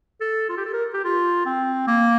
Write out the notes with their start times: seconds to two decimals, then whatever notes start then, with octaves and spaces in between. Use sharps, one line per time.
0.21 A4
0.49 F4
0.57 G4
0.66 A4
0.73 A#4
0.94 G4
1.04 F4
1.46 C4
1.88 A#3